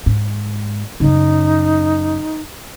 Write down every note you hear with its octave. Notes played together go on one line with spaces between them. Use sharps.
G#2
F#2 C#3 D#4